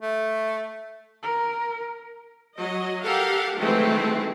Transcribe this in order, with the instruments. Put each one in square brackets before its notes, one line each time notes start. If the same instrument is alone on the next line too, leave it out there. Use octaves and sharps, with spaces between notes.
[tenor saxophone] A3
[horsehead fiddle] A#4
[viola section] F#3 D#5
G4 A4 A#4 F5 F#5
D#3 E3 F#3 G#3 A3 C4